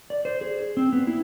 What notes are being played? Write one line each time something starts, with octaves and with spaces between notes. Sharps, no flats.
D5
C5
G#4
C4
B3
E4